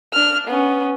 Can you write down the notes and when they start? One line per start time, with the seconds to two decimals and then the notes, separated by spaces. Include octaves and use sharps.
0.13 D4 F6
0.47 B3 C#4